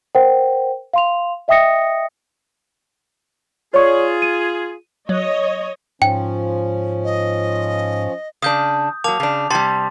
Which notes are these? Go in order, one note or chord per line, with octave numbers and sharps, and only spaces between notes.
A#4 C5 F#5 G5
F5 C6 F7
D#5 E5 G5 D#6 A#6 C#7
F4 G#4 C#5 D5 C#6
D#7
F#3 C#5 D#5
G#2 F3 C#4 G5
D#5
C#3 D4 D#6 G6
F#3 A#3 A5 D6 F7
C#3 D4
C3 G3 A5 C6 A6